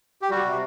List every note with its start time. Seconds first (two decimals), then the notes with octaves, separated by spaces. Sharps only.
0.22 G4
0.30 G3 F#4
0.46 C3